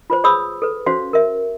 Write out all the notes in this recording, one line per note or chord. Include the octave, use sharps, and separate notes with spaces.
F4 B4 C5
G#4 C5 C#5 B5 D#6 E6
A4 B4
C#4 F#4 C5 C#5 F5
A#4 E5